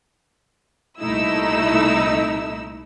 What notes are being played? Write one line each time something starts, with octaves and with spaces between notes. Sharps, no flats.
C2 A#2 A3 D#4 E4 E6